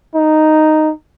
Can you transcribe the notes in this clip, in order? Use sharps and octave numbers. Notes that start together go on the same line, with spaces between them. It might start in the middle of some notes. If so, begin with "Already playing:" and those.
D#4